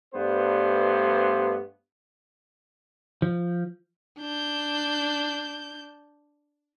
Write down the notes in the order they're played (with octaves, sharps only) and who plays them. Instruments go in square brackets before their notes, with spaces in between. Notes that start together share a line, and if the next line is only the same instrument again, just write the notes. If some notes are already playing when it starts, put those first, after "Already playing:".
[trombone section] G2 G3 A3 B3 C5
[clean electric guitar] F3
[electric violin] D4 G6